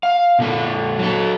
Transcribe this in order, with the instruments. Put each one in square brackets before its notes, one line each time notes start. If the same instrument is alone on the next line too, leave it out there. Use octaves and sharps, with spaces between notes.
[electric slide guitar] F5
A#2 D3 A4
F#3 A4